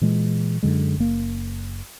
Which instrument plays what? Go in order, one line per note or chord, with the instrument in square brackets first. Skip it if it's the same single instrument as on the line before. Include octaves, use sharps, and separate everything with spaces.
[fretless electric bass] A#2 E3 G#3
F#2 D3 G#3
F#1 A#3